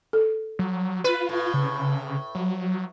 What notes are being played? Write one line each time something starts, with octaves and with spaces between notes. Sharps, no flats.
A4
F#3
F4 B4
A2
C#3
F#3